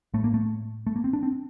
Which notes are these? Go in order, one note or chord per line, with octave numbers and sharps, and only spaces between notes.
A2 A3
A#3
A3
A3
A#3
C4
D4
C4